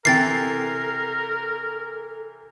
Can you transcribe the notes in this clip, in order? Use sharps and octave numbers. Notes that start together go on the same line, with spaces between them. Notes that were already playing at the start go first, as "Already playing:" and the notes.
C3 E3 A4 A#4 G5 A6 C7